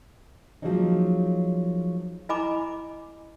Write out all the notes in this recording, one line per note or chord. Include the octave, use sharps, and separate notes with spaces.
F3 F#3 G#3 A#3 C#4 D#4
E4 D#5 G#5 A#5 B5 D6